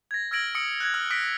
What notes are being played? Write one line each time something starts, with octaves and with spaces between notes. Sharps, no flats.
G#6 A#6
E6 F6 G#6 A#6 D7 F#7
D#6 E6 A#6 C#7 D7 F#7
F#6 G#6
E6 F6 F#7
D#6 F#6 A#6 B6 D7